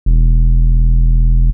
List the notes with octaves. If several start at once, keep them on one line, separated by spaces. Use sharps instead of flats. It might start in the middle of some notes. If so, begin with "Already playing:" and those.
E1